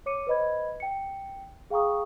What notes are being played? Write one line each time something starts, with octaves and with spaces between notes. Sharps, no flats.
C#5 D6 C#7 D#7
B4 C5 D#5 B5 G#6
G5 C#7
G#4 F5 G5 A#5 C#6 D#6